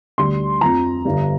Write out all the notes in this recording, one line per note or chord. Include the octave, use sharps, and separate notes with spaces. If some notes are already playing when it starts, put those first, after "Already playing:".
D2 D3 G3 C6
F2 F3 A#5
G1 G2 G3